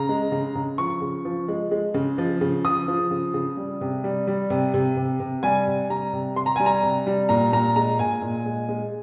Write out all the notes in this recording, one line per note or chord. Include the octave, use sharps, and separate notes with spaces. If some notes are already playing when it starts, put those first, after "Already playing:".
Already playing: C#3 A#5
G#3
C#3
C#3
F3 C#6
C#3
F3
G#3
G#3
C#3
F3
C#3
F3 D#6
F3
C#3
C#3
G3
C3
G3
G3
C3
C3
C3
C3
G3 G#5
C3
G3 A#5
C3
C3 C6
A#5
G3 G#5
A#5
C3
G3
A#2 A#5
A#2 A#5
G#3 A#5
A#2 G#5
A#2
G#3
G#3